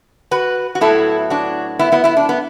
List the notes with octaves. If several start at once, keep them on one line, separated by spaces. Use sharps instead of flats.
F#4 B4
F#4
A2 F#3 B3 E4 A4
D4 F#4
B3 E4
B3 E4
B3 E4
D4
B3